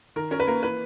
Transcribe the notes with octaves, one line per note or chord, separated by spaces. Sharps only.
D#3 A#4
C#4 A#4
B4
A#3 A#4
E3 B4